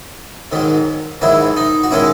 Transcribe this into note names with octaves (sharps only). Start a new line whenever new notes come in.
G#2 D#3 F#3
G#2 D#3 F#3 E4
D#4
F#4
D#3 G#3 C#4 E4